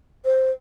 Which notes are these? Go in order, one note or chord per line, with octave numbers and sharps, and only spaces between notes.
C5